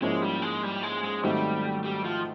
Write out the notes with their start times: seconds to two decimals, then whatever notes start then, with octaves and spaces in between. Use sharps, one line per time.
0.02 G#2 F3 G#3 A#3 C#4 E4
0.22 G3
0.42 G#3
0.63 G3
0.83 G#3
1.03 G#3
1.23 G#2 D#3 F#3 G3 A3 C4
1.85 G3
2.05 F3